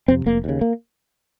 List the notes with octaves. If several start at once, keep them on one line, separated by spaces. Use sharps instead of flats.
F2 C3 C4
F1 A#3
D#2 C#3
A#3